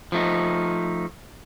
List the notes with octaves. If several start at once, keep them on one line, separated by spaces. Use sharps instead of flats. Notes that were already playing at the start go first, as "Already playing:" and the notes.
F3 A3 D#4